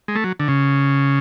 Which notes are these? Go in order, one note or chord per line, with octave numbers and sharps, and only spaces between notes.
G#3
A3
F#3
D3
C#3